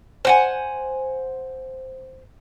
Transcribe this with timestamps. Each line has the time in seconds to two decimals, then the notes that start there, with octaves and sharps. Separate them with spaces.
0.25 C5 F#5 G#5